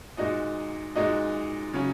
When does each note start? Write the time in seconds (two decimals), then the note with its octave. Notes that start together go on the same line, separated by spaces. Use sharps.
0.17 A#2 G#3 D#4 F#4 D#5
0.96 A#2 G#3 D#4 F#4 D#5
1.73 C#3 F#3 C#4